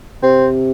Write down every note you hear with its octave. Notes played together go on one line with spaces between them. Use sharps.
C3 C4